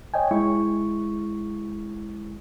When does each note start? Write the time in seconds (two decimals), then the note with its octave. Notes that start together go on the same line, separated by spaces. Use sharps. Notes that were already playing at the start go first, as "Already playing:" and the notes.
0.14 C#5 D#5 G5 G#5
0.31 G#3 E4 C#6